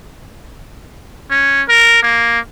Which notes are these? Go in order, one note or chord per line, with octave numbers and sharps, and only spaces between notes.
C#4
A#4
A#3